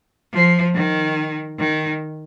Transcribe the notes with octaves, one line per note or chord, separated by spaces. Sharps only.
F3
D#3
D#3